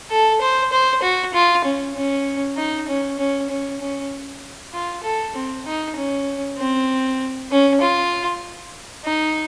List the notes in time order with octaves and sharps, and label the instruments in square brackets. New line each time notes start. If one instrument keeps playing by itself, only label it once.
[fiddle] A4
C5
C5
F#4
F4
C#4
C#4
D#4
C#4
C#4
C#4
C#4
F4
A4
C4
D#4
C#4
C4
C#4
F4
D#4